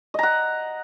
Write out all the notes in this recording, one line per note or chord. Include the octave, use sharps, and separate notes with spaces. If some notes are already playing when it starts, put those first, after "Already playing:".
D#5 F#5 A#5